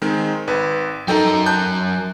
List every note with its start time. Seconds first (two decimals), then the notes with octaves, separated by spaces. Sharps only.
0.02 D#3 G#3 C4
0.48 G#1 B4
1.08 F#3 D#4 A4 A#4 G5
1.46 A5 F#6 G6